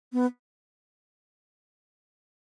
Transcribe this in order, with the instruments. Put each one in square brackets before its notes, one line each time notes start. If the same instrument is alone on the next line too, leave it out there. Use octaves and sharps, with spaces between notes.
[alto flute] B3